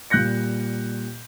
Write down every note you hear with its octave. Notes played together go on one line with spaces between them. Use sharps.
A#2 G3 F#6 G6 A#6 C#7